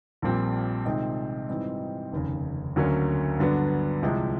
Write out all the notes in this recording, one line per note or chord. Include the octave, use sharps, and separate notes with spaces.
A#1 A#2 G3 C4
C3 D#3 G#3 C4 D#4
G#2 E3 G3 C4 D#4
F1 D#2 C#3
D2 D3 F#3 A#3 C#4
G2 D3 F#3 B3 D4
C2 C3 F3 G#3